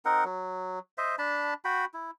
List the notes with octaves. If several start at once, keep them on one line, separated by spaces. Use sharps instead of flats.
C4 D#4 A#4 F#5
F#3
C5 D#5 E5
D4 A5 B5
F#4 G5 B5
E4